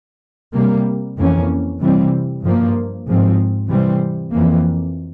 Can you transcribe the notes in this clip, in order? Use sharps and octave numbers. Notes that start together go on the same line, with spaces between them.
C3 G3 A#3
F2 E3 A#3 C#4
C3 E3 G3 C4
G2 F3 A#3
G#2 F3 C4
C3 E3 G3 C4
F2 E3 A#3